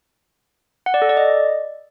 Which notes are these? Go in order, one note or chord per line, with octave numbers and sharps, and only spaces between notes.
F#5
D5
A4
D5
D#5